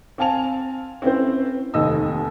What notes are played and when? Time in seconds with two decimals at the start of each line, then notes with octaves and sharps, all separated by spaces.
0.18 C4 F5 G#5 A5 F7
1.02 C4 C#4 E4 C5
1.74 F1 D#2 D#5 E6